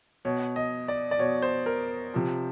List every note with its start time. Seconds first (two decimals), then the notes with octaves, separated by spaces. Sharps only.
0.25 B2 C#5
0.56 D#5
0.88 D5
1.11 D5
1.19 B2 C#5
1.42 C5
1.66 A#4
2.14 C3 F3